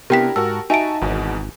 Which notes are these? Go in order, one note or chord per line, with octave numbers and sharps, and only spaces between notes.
C3 B3 D4 E4 G4 A#4 G5 B6
G#2 F#4 A#4 A5 E6
D#4 F#4 E5 G#5 A5 D7
G#1 E2 B2 E3